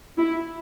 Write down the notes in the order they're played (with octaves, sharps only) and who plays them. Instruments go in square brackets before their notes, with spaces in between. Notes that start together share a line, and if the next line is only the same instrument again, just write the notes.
[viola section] E4